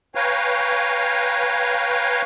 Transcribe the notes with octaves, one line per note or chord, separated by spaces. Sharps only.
B4 C#5 F5 G5 G#5 A#5